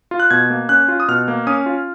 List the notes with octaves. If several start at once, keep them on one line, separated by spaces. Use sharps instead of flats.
F4
F#6
B2 G#6
A#3
C#4 F#6
F4
D#6
B2 F6
A#3
C#4 D#6
F4